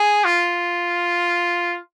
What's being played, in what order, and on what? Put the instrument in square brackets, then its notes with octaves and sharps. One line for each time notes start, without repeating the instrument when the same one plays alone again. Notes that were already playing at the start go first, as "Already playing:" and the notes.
Already playing: [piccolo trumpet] G#4
F4